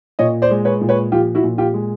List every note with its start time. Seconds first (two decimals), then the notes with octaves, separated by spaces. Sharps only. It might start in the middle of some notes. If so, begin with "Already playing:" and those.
0.19 A#2 C#5 D#5
0.42 C5 D5
0.50 G#3
0.65 B4 C#5
0.81 A#2
0.89 B4 C#5
1.12 F3 F4 G4
1.35 E4 F#4
1.43 A#2
1.58 F4 G4
1.74 G#3